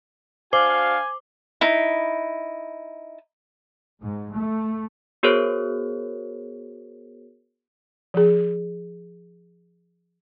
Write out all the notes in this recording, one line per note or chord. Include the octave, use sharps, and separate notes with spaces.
D4 F#4 C5 F5 G#5 D6
D#4 E4
G#2
A3
B3 F#4 G#4 A#4 C5 C#5
F3 G#4